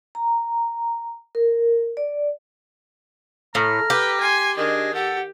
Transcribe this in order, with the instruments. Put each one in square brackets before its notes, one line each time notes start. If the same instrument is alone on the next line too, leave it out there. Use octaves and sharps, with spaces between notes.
[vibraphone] A#5
A#4
D5
[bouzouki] A2 [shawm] A#5 [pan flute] F6
[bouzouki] G4 [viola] B4
[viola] G#5 C6
[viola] D#3 D4 [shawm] G#4 [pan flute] D#5
[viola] G4 [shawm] A4 [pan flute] F#5